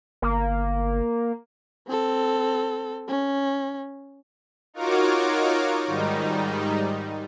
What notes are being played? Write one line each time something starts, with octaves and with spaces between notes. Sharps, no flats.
G1 A#3
C4 A4
C#4
D#4 F4 F#4 A#4 C#5 D6
G#2 D#3 G3 D#4